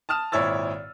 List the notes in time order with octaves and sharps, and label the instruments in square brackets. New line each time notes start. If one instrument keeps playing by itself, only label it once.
[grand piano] A5 D#6 F6 E7
G#1 A#2 E4 C#5 E6 A6